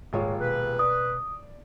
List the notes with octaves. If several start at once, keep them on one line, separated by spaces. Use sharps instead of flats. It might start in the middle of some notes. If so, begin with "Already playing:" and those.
D#1 G#2 G#3 F4 C#5
B2 B4
D5 D#6